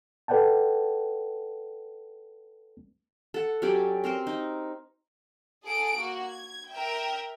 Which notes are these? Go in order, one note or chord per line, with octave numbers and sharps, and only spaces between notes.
A4 B4 D5 F#5 G5 A5
A4 F#5
F#3 C#4 G4 D5
C4 A#4 C5 C6
D#4
G#4 A4 F#5 D7
A#3 F#4
G#6
A#4 E5 G5